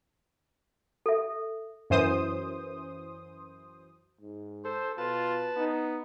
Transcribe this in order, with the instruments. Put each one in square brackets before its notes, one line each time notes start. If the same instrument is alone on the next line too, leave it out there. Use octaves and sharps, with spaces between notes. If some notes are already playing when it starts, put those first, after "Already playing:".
[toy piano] A4 E5
[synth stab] F#2 E3 C5 D#6
[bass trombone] G#2
[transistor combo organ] A4 [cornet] C5
[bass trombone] B2 [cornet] F4 [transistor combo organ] B4 A5
[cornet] B3 [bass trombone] D#4